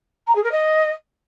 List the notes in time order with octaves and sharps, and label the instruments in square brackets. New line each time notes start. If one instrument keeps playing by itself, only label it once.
[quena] A#5
G#4
A#4
D#5